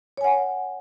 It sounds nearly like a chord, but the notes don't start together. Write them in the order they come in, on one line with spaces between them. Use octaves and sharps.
C#5 G#5 F#5